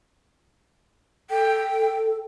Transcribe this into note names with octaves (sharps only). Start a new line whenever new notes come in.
A4 G5